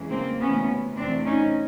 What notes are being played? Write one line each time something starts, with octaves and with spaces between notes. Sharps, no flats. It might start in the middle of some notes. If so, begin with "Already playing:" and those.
Already playing: E2 C#3 E3 G#3
A#3 C4
D2 C3 E3 B3 C#4
E2 C3 E3 A3 C4 D4
C#4 D#4